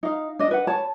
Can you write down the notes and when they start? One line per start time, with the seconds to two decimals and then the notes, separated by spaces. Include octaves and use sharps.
0.03 D#4 F5
0.39 D4 D#5
0.51 B4 F#5
0.67 C#5 A5 B5